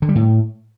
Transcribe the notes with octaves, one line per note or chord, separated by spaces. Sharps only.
D3
G3
A2